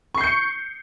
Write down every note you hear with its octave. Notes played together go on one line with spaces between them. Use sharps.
C#6 G6 C7 C#7